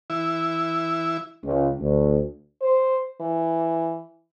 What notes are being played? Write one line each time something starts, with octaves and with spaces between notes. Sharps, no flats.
E3 E4
C#2
D2
C5
E3